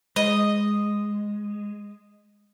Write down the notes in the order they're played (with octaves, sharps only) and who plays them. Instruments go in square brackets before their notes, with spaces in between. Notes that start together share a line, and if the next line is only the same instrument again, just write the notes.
[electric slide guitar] G#3 [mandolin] D#5